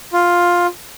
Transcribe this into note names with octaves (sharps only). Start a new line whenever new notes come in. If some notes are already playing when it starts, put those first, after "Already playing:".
F4